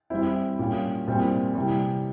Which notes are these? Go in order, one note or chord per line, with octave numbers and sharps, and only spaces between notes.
E3 G3 C4 E4
A#2 G3 C#4 F4
A#2 G3 C4 E4
C3 E3 G3